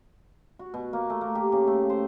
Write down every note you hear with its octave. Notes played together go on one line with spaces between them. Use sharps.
F#4
B2
A#3
A3
A#3
G4
C#3
A3
C5